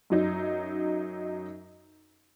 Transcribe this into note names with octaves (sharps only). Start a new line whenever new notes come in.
F#2 F#3 D#4